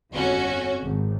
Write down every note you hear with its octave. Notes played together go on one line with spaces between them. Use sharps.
G1 F2 C#4 F#4
G#1